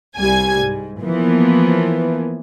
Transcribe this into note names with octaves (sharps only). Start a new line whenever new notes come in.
C2 G3 G#5 G#6
G#2
E3 F3 A#3 B3